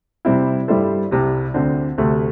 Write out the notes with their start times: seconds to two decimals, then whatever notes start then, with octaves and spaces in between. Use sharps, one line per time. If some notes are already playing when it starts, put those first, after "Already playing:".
0.25 C3 G3 C4 E4
0.68 G2 G3 E4 A4 C5
1.11 C2 C3 G3
1.54 D2 D3 C4
1.98 D2 C3 A3